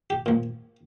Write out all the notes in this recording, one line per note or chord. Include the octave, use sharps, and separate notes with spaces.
G4
A#2 F3